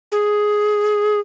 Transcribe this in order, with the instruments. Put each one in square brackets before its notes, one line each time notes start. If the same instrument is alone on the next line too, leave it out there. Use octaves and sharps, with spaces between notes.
[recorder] G#4